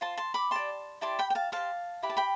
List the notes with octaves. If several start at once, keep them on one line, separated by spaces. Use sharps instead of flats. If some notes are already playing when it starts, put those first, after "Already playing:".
F4 C5 A5 C6
A5 C6
B5 D6
G4 D5 A5 C6
E4 G4 D5 A5 C6
G5 B5
G5
F5 A5
G4 C5 F5 A5
E4 G4 B4 B5
A5
G5 B5